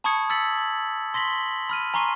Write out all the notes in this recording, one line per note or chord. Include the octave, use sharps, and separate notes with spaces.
A5 B5 C#6 D#6 G#6 C#7
E6 G#6 A6 B6 C#7 F#7
C6 A#6 B6 F#7 G7
B5 F6 D#7
G#5 A#5 C6 C#6 C7